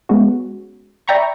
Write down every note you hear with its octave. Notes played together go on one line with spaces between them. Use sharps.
G#3 B3 C#4 F#4
D5 E5 G5 A#5 B5 C#6